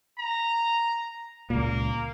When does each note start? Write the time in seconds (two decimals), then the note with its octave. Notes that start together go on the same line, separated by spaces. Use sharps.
0.18 A#5
1.50 C#2 A#2 A#3